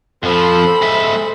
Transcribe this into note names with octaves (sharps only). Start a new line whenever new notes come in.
F2 F3 A4 C5 B5
G#3 E5